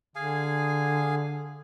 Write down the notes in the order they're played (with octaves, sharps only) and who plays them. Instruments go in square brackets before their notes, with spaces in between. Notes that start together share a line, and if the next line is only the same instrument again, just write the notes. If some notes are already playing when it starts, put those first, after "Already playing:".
[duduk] D3 [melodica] G#4 F5 G#5